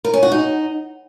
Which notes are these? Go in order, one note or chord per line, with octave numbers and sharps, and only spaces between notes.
A#4
C#4
F#4
D#4